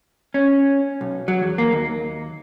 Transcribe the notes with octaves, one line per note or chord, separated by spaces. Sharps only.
C#4
B1
F#3
E2
A#3
D#2